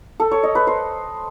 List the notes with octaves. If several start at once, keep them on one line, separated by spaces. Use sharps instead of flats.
A4
C#5
D#5
B4
C5